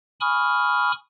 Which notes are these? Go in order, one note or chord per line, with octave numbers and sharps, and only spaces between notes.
G#5 B5 C#6 D#6 F6